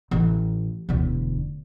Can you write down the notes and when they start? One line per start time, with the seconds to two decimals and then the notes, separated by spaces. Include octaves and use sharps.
0.11 A1
0.89 E1 D2